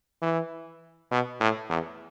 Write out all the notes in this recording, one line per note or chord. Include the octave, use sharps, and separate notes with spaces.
E3
B2
A2
E2